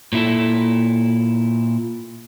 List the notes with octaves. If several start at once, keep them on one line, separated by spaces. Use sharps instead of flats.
A#2 E4 A4